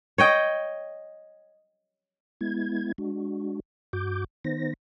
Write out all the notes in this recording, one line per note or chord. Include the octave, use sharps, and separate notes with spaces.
C#5 D#5 G5
G#3 B3 E4 G#6
G#3 D4 F#4
G2 F#4 D6 G6
D#3 B3 D#4 C5 A#6